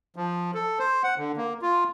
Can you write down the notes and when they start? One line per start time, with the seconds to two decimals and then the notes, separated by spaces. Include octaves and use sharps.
0.16 F3
0.54 A4
0.79 C5
1.03 F#5
1.18 D3
1.37 A#3
1.62 F4